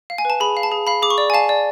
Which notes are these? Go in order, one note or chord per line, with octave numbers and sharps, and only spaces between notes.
F5
G#5
B4 A5
G#4 B5
F5
A5
G#4
F5 B5
G#4 D6
C#6
D5
G#5
F5 A5
D5